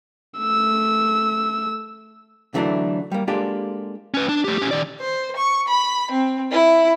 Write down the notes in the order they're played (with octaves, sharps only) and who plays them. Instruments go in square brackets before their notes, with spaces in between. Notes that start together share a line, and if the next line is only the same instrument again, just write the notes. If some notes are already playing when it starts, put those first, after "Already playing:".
[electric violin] A3 E6
[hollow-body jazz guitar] D3 E3 F#3 A3 C4 D4
G3 A#3
G#3 A#3 D4 F4 G4 A4
[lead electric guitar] C#4 B4
D4
A3 G4
C#4 G4
D#3 D5
[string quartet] C5
C#6
B5
C4
E4